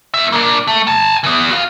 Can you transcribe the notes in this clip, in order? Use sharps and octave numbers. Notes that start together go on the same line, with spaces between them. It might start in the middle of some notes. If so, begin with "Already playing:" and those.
E2 E5
A#3 D4
A3
G#5 A5
E3 B3
F#4 F5